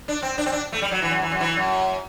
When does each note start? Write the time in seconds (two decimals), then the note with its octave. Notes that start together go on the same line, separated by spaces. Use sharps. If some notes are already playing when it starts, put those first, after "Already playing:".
0.08 D4
0.22 C4
0.38 D4
0.46 C4
0.52 D4
0.72 A3
0.82 G3
0.91 F#3
1.02 E3
1.11 F#2
1.22 E3
1.32 F#2
1.41 E3
1.56 F#2